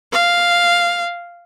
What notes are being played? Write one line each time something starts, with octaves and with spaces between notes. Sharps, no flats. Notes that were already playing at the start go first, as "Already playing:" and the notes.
F5